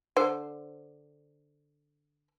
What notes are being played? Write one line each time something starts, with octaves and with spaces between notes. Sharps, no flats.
D3 C5